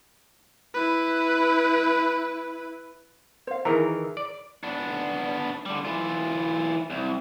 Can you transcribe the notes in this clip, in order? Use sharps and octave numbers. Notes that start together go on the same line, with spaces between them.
E4 B4
C5 F5
D#3 E3 G#4 A#4 A#5
D5
B3 D4
D3 G3
E3 F4
C2